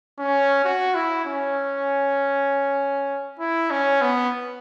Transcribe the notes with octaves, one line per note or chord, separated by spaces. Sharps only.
C#4
F#4
E4
C#4
E4
C#4
B3